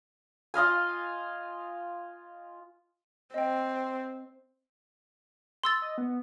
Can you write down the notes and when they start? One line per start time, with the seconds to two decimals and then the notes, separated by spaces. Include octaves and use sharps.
0.54 F4 D#5 F5 G#5
3.34 C4 D#5 G5
5.64 C6 E6 A6
5.82 D#5
5.98 B3